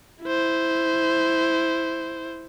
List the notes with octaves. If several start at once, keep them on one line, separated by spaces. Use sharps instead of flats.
E4 C5